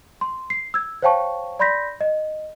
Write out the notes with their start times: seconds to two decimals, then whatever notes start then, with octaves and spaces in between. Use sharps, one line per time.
0.21 C6
0.50 C7
0.74 E6 G#6
1.02 C5 C#5 F5 G5 A5 C#6
1.59 D5 B5 C6 G6 A#6 B6
2.01 D#5